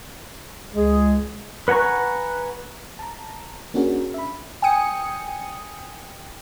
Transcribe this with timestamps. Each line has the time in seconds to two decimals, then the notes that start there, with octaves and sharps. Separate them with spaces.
0.72 C#2 G#3 G#4
1.68 B4 F#5 G#5 A#5 C#6
2.99 A5 A#5
3.74 A#3 C#4 D4 F#4 G#4 A#4
4.14 E5 B5
4.62 G5 G#5 D#6 C#7